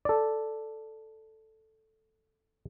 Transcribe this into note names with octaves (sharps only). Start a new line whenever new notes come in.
A4 D5